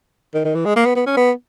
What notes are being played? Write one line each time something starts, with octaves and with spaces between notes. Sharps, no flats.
D#3
D#3
E3
G#3
A#3
B3
B3
C#4
B3